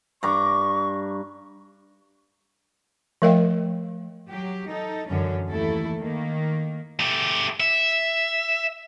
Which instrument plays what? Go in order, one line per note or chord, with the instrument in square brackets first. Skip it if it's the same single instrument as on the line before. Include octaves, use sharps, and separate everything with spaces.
[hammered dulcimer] G2 A#5 D6 [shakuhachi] C#6
[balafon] F3 A3 A#4 D#5 F5 G5
[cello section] F#3 G4
D#4 A4
F#2 D3 E3 C#4
D#2 E3 A3 E4 A4
D#3 A#3
[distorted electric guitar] A3 G4
E5